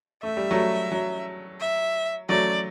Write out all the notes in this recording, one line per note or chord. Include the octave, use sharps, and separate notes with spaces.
A3 E5
G3
F#3 A3
F#3
E5
F#3 A3 D5